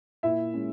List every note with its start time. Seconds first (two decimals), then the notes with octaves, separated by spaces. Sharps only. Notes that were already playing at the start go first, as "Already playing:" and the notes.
0.23 A#2 E4 E5
0.54 G#3 C#4